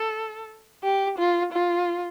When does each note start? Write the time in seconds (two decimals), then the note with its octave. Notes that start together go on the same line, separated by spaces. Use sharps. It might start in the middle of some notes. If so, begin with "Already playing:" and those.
Already playing: A4
0.84 G4
1.19 F4
1.53 F4